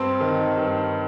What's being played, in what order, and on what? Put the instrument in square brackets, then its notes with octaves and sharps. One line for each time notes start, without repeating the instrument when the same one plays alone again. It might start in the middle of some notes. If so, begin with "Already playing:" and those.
Already playing: [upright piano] G2 C4
D#3
G2